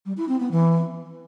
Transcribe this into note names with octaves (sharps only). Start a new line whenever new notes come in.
G3
E4
C4
B3
E3